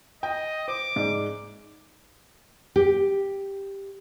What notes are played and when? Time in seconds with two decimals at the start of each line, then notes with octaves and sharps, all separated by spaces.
0.23 D#5 G5
0.68 C5 D6
0.96 G#2 D5
2.76 G4